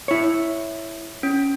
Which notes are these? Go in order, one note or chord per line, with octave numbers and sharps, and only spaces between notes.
E4 C#5
C#4